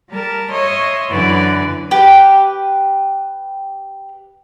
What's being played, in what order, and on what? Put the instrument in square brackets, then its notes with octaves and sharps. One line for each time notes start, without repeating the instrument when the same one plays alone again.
[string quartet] G3 A#4 A5
C#5 D#5 E5 C6
F#2 D3 E3 B4 D5
[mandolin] G4 B4